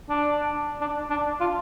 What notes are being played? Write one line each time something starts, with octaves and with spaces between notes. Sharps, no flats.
D4
D4
D4
F4